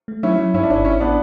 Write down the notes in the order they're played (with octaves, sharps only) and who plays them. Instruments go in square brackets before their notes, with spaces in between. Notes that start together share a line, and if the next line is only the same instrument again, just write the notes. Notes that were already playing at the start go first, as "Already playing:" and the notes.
[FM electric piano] A3
[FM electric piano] F#3 [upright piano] C#4 E4
[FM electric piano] F#3
[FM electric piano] G2 [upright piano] C#4 E4
[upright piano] D4
[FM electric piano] G1 [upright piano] C#4 E4
[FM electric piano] A1 [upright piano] C#4 E4
[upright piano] B3 D4